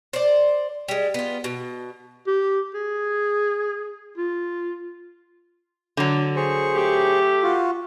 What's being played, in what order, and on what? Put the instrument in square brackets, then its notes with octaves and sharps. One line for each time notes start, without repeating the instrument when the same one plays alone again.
[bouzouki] C5 D5
G3 G#3
B3 F4
B2
[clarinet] G4
G#4
F4
[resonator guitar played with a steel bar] D3 F#3
[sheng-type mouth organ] G#4 C5 C#6
[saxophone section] A3 G4
[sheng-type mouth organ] F4 F#4